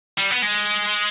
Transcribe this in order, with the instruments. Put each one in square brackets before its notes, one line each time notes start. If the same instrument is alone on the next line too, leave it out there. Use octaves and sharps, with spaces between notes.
[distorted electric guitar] G3
B3
G#3